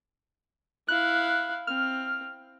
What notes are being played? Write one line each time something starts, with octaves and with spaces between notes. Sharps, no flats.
E4 F5 F#6
C4 F6